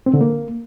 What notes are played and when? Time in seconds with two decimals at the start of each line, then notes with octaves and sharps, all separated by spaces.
0.06 C4
0.14 D3
0.21 A#3